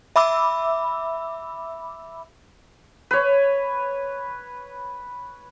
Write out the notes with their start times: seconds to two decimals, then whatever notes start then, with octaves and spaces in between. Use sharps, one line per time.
0.16 E5 B5 D6 E6
3.11 B4 C#5